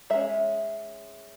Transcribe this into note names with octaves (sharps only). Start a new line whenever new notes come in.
G#3 C#4 E5